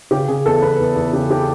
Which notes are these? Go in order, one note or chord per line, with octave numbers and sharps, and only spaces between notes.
C#3 G4
C#3 G#4
E2 A4
E2 B4
E2
E2
C#3 G4
G4